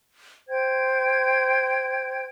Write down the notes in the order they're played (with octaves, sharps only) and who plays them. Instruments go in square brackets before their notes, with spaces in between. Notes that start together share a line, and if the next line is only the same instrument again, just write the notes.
[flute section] C5 G5 G#6